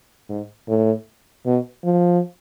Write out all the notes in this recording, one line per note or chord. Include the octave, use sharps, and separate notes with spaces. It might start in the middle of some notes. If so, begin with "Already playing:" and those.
G#2
A2
B2
F3